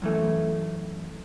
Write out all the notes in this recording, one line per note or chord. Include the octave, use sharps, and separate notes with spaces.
F#2 E3 A3